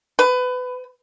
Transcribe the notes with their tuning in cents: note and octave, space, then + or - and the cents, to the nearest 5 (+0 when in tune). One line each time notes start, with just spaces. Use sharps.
B4 +25